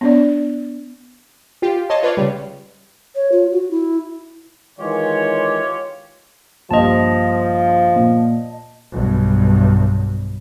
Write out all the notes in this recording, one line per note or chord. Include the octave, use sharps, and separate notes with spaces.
B3 D4 D5
F4 G4
C#5 D#5 A5 C6
F4 B4 C#5 D5
C#3 G3
C#5
F4
F#4
E4
D#3 E3 G#3 F4 G4 C#5
A#1 G2 F3 D#5 A5
A#2
B1 G2